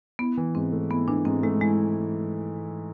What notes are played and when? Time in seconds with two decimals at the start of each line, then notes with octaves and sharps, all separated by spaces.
0.19 B3 E4
0.37 E3
0.55 G#2 C4
0.72 A3
0.90 B3 E4
1.08 E3 D4
1.25 G#2 C4
1.43 G#3 A3
1.61 G#3 E4